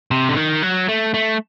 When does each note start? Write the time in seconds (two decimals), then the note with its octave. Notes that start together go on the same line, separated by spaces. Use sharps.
0.11 C3
0.29 D3
0.37 D#3
0.63 F#3
0.89 A3
1.14 A3